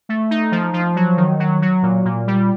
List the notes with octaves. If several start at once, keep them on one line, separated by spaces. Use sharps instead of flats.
A3
D#4
F3
F3
F#3
D#3
F#3
F#3
A#2
A#2
G3